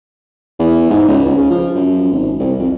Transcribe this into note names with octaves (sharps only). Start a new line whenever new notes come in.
E2
G#2
C#2
C#2
C#3
F3
F#2
G#1
C2
F2